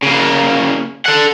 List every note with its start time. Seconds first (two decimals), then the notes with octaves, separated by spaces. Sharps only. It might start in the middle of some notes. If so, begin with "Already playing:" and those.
0.03 C#3 A#3
1.05 A4 F#5